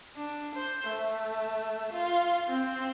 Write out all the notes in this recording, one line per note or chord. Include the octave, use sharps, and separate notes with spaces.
D4
C5
A3
F4
C4